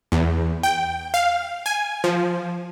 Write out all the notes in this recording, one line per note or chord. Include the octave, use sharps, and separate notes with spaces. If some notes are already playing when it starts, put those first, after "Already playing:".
E2
G5
F5
G#5
F3